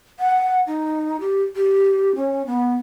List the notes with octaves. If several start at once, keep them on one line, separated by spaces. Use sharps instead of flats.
F#5
D#4
G4
G4
C#4
B3